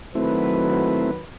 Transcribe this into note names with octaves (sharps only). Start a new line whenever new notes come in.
D#3 F#3 A3 C4 E4 B4